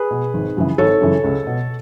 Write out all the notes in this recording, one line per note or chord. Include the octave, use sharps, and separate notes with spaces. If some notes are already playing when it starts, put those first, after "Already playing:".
Already playing: G#4 B4
B2
G#1
F#2 C#3 E3
G#1 A4 C#5
F#2 C#3 E3
C#2
B2